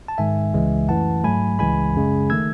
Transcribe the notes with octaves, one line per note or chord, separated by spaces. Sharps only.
A5
G#2 D#3 G#3 E5 G#5
C#2 C#3 E3 G#3
F#2 E3 A3 F#5 A5
G#2 F#3 A3 G#5 B5
C#2 C#3 E3 G#3 G#5 B5
F#2 C#3 G#3
D#3 A3 E6 G#6